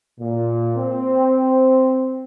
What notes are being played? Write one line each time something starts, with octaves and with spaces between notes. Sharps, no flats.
A#2
C4